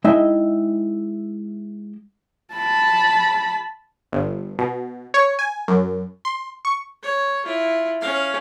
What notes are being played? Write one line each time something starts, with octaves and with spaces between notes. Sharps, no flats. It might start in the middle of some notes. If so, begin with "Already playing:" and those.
G#3 D#4 E4 D#5 E5 G5
A5 B5
G1
B2
C#5
G#5
F#2
C6
C#6
C#5
E4 F4
C#4 F5